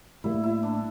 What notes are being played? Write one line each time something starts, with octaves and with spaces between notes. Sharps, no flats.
A2 G3 A#3 E4
E4
D4